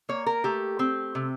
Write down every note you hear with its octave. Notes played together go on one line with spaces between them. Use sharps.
A#3 C#5
A#4
A3 G4
C4
C3